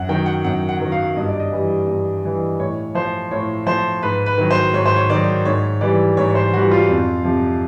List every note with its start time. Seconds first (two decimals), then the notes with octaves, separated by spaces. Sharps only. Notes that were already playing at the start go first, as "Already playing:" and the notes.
Already playing: F#2 F#5
0.09 D#3 F#3 G5
0.26 F#5
0.44 F#2 F#5
0.69 F#5
0.80 D#3 F#3
0.92 F5
1.16 G2 D#5
1.29 D5
1.40 D#5
1.52 E3 G3
1.87 G2
2.23 E3 G3
2.59 A2 C#5
2.95 F3 C5
3.31 A2 C#5
3.66 F3 C5
4.03 G#2 B4
4.26 B4
4.38 D#3 F#3
4.51 C5
4.74 G#2 C#5
4.86 C5
4.96 C#5
5.10 D#3 F#3 D5
5.45 G#2 C#5
5.81 E3 G3 D5
6.17 G#2 C#5
6.31 C#5
6.35 C5
6.53 E3 G3 F#4
6.71 F4
6.89 F2
7.25 C3 F3